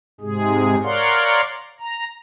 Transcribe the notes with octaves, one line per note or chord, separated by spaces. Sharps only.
G#2 C3 G#3 G#4
A#4 C#5 D5 F5 F#5 C6
A#5